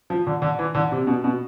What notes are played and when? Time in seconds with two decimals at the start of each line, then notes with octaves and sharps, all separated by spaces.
0.10 F3
0.27 D3
0.42 D3
0.59 E3
0.75 D3
0.92 C3
1.07 B2
1.24 B2